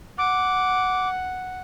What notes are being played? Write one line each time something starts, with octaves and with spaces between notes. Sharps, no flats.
F#5 D6